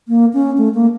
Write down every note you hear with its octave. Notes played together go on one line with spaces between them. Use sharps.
A#3
C#4
A3
A#3